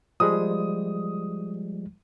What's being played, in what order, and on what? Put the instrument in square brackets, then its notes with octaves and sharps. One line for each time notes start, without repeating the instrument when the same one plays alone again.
[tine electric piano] F3 G3 G#3 [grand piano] D#6